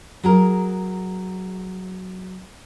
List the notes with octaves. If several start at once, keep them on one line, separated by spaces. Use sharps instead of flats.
F#3 G#4 A#4